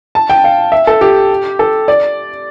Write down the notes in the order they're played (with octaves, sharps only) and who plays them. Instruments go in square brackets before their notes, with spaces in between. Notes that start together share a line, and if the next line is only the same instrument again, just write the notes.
[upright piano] A5
G5
F5
E5
A4
G4
A4
D5